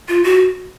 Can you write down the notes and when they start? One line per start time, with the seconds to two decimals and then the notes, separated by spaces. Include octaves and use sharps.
0.08 F4
0.24 F#4